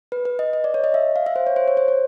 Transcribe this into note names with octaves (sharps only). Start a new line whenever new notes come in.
B4
B4
D#5
D#5
D5
C#5
D#5
E5
F5
E5
C5
C#5
C5
C#5
C5
C#5